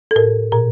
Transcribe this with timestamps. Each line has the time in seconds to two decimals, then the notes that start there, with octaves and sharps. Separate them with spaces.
0.11 A4
0.16 A2 A#4
0.52 A#2 A#4